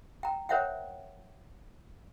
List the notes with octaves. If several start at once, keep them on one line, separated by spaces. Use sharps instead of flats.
G5 A#5
A#4 C5 C#5 E5 F#5 G5